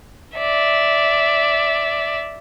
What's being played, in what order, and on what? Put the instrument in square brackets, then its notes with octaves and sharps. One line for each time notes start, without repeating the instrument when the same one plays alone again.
[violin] D5 E5